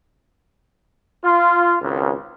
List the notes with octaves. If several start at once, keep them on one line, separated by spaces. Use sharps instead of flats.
F4
G#1 C#2